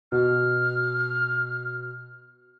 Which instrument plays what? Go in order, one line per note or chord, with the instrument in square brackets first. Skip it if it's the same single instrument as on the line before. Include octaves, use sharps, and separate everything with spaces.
[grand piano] B2 [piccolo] F6